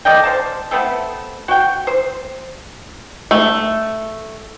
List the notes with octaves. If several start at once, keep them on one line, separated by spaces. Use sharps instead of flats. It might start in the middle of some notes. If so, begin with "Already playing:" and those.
A4 D5 D#5 G5
C5 F5 A5
A3 B3 C4 A4
F#4 G5
C5
A3